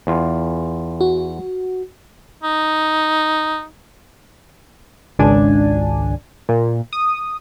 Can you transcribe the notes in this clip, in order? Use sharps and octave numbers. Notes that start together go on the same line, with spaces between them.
E2 F4
F#4
D#4
G#1 C#2 D4 G#5
A#2
D#6